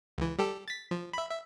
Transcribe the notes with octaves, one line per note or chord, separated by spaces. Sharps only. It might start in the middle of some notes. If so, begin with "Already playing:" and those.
C#2 E3
G3 G4 A4
A6 B6
F3
E5 B5
E5